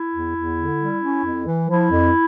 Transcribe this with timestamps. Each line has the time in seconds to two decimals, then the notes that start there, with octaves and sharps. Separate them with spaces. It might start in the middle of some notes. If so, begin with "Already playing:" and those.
Already playing: E4
0.13 E2
0.36 E2
0.58 D3
0.80 G3
1.02 C#4
1.25 F2
1.46 E3
1.69 F3 E4
1.91 F2